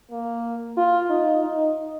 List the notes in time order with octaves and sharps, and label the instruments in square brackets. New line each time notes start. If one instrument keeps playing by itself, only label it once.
[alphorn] A#3
F4
D#4
D#4